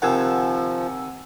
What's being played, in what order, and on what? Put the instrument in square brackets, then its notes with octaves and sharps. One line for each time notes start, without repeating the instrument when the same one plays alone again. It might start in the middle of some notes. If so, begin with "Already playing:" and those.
[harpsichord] C3 D#3 [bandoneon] F3 [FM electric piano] F#5 G#5 E6